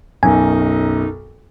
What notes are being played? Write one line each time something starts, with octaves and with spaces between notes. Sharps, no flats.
B1 F#2 D#4 A#4 G#5